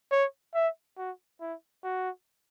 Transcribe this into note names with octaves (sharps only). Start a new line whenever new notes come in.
C#5
E5
F#4
E4
F#4